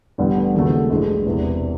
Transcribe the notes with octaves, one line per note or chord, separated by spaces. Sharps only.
A1 G2 D3 G3 B3
D#2 C#3 F#3 A3
A1 G2 E3 G#3
E1 E2 C3 E3